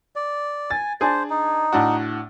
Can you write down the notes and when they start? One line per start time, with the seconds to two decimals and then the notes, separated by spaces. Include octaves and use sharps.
0.16 D5
0.70 G#5 A6
1.01 D4 G#4 C5
1.30 D#4
1.72 A2 D4 F#4